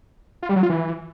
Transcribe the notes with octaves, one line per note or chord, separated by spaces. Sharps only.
F4
G3
F#3
F4
E3